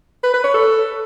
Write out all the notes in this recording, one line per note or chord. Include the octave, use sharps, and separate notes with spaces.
B4
B4
C#5
A4